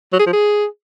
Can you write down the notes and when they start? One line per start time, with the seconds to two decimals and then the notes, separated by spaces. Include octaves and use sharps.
0.12 F#3
0.19 G#4
0.26 F3
0.33 G#4